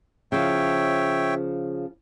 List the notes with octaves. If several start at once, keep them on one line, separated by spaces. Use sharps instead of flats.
C#3 F3 C#5 E5 G5